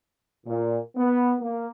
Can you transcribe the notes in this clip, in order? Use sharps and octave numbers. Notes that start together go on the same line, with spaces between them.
A#2
B3
A#3